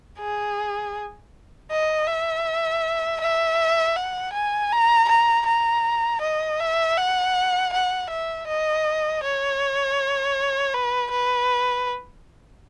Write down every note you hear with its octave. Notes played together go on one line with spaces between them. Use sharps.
G#4
D#5
E5
E5
F#5
G#5
A#5
A#5
A#5
D#5
E5
F#5
F#5
E5
D#5
C#5
B4
B4